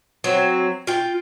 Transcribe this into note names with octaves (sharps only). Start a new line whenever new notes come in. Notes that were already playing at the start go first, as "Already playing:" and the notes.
F#3 C4
F4 G5